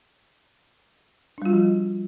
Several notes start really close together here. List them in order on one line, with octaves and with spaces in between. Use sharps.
D4 G3 F4 F#4 F3